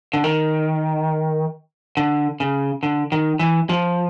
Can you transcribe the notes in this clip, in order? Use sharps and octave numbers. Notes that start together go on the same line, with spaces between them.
D3
D#3
D3
C#3
D3
D#3
E3
F3